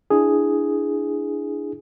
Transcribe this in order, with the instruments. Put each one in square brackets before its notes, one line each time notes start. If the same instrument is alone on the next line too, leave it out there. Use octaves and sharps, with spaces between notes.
[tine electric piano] D4 E4 G#4